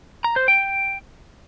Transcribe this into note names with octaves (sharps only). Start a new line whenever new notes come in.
A#5
C5
G5